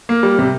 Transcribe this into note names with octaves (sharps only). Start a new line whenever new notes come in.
A#3
G3
C3